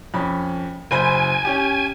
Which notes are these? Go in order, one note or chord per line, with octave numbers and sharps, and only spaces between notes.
F2 C#4 B5
F#1 C5 G#5 B5
C#4 G4